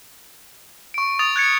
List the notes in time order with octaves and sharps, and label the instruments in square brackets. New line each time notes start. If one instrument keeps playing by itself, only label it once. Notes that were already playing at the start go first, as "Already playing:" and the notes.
[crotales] C#6 D7
D#6 A6 F7
F#6 G#6 A6 C#7